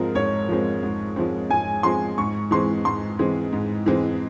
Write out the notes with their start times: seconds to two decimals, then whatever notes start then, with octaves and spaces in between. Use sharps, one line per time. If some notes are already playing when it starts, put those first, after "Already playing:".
Already playing: G#2 F3 G#3 C4 A#4
0.15 G#2 C#5
0.49 F3 G#3 C4
0.83 G#2
1.16 F3 G#3 C4
1.50 G#2 G#5
1.83 F3 G#3 C4 C6
2.18 G#2 C#6
2.51 E3 G#3 C4 C6
2.85 G#2 C6
3.19 E3 G#3 C4
3.53 G#2
3.86 E3 G#3 C4